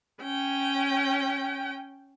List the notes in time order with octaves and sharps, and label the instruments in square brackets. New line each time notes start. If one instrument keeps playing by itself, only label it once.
[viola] C#4 G5